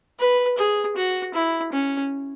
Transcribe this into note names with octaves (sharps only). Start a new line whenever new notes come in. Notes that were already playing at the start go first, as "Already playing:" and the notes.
B4
G#4
F#4
E4
C#4